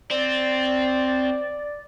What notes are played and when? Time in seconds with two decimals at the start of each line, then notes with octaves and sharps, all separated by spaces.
0.11 C4 D5